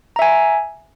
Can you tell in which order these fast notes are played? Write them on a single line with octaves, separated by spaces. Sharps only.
A#5 E5 G#5